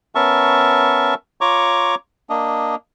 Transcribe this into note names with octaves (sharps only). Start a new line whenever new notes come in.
B3 C#4 A#4 E5 A5 C#6
F4 C#5 A#5 C#6 D6
A#3 D4 D#5